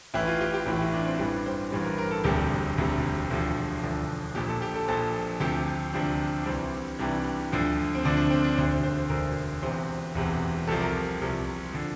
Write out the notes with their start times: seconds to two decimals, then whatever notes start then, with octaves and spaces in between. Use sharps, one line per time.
0.14 A1 A2 E3 E4
0.27 F4
0.41 G4
0.54 G4
0.66 A1 A2 E3
0.80 E4
0.93 D4
1.06 C4
1.19 A1 G2 E3 G3 D4
1.46 C5
1.71 A1 G2 E3 G3 C5
1.85 A#4
1.98 A#4
2.11 A4
2.24 E1 D2 C3 G3 G4
2.78 E1 D2 C3 G3
3.30 E1 D2 D3 F3
3.83 E1 D2 D3 F3
4.35 A#1 A#2 F3 G4
4.48 A4
4.62 G4
4.75 A4
4.88 A#1 A#2 F3 A4
5.40 D2 C3 F3 G4
5.93 D2 C3 F3 D4
6.42 D4
6.46 C2 C3 E3 G3 C4
6.99 C2 C3 E3 G3 D4
7.52 D2 D3 F3
7.95 C4
8.04 D2 D3 F3 D4
8.17 D4
8.30 C4
8.44 D4
8.57 E1 D2 D3 C5
8.71 C5
8.83 C5
8.96 C5
9.09 E1 D2 D3 A#4
9.62 E1 E2 C3 C5
10.15 E1 E2 C3
10.67 C2 C3 F3 A4
10.81 A#4
11.21 C2 C3 F3
11.73 D3 F3